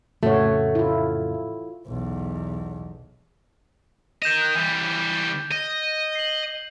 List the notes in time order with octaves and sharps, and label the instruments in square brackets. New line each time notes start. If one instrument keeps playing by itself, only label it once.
[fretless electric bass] F2 C#3 [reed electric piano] A2 [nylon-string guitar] A3 [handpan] F#4 C#5
[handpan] E4 F4
[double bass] B1 E2
[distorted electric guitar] A#4 D#5 [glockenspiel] G6 E7 F7
[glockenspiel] F#6
[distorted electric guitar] E3 G3
D#5
[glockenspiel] C7 F#7